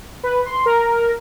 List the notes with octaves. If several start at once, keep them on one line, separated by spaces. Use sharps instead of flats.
B4
C6
A#4